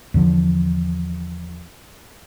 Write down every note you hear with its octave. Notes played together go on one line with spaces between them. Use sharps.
E2 D3 F3